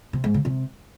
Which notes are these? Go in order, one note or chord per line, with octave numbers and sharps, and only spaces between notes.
C3
G#2
C#3
C3